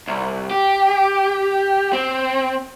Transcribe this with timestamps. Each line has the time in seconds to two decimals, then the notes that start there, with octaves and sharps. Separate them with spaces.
0.07 C2
0.51 G4
1.93 C4